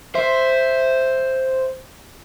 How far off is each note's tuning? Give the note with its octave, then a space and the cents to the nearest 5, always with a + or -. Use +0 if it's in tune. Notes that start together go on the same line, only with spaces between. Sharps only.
C5 +0 E5 +0